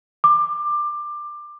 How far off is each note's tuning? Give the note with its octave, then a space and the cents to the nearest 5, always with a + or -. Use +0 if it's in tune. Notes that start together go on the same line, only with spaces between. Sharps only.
D6 +20